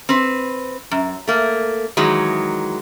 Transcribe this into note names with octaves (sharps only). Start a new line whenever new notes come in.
C4 B4
F#2
A3 A#3
D#3 E3 F#3 G#3